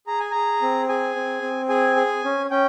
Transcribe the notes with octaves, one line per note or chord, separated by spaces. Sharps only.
G#4 A#5
G#5
G#4 A#5
C4
G#4 G#5
C4
C4
G#4 G#5
G#4
C#4
C#4 G5